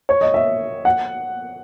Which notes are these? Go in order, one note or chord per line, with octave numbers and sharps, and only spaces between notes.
C#5
D#5
E5
F#5